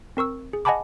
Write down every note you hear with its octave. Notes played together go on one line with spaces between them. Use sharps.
C4 A#4 C#6 E6
G#4
D#5 F#5 G#5 A5 B5 D6